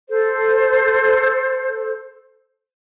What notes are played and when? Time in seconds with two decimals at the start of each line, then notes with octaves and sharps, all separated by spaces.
0.09 A4 C5